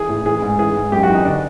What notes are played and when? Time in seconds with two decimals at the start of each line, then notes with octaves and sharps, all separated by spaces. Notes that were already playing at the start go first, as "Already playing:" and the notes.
Already playing: E3 G#4
0.09 A2
0.25 E3 G#4
0.42 G#2
0.59 E3 G#4
0.76 G#2
0.92 F#2 G4
1.03 F#4
1.09 E3
1.15 D#4
1.25 D3 D4